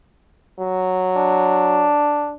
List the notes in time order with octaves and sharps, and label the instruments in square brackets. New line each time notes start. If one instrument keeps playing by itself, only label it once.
[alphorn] F#3
[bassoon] D4